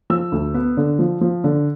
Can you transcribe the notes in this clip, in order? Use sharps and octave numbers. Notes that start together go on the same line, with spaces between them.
F3 E6
D2
B3
D3
F3
F3
D3